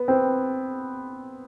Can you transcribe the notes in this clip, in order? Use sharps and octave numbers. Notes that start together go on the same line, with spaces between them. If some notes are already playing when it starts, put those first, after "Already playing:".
Already playing: B3
C4